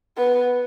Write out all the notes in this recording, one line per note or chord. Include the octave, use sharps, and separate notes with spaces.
B3